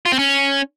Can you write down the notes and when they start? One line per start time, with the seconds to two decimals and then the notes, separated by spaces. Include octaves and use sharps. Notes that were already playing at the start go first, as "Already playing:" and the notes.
0.06 F4
0.12 C4
0.19 C#4